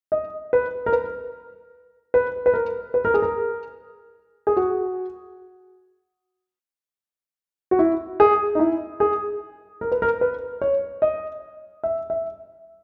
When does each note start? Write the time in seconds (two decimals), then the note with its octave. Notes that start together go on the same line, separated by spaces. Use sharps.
0.12 D#5
0.53 B4
0.86 A#4
0.93 B4
2.14 B4
2.46 B4
2.54 A#4
2.94 B4
3.05 A#4
3.14 G#4
3.22 A#4
4.47 G#4
4.57 F#4
7.71 F#4
7.79 E4
8.20 G#4
8.55 D#4
8.59 E4
9.00 G#4
9.81 A#4
9.92 B4
10.02 A#4
10.21 B4
10.62 C#5
11.02 D#5
11.84 E5
12.10 E5